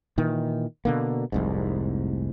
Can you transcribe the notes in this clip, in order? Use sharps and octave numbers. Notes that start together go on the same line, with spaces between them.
A#2 D#3 E3
B2 D3 A#3
F1 C2 G#2